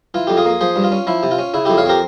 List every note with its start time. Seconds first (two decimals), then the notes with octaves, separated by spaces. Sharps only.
0.14 E3 F4
0.27 F2 G4
0.37 F4 G#4
0.45 A#3
0.61 F3 G#4 C5
0.76 G2
0.84 F4
0.92 C#4
1.07 F3 E4
1.23 C3
1.31 F4
1.39 C#4
1.54 C#3 E4
1.65 F2 E4 G4
1.77 C#5 F5
1.86 C4 G4 A#4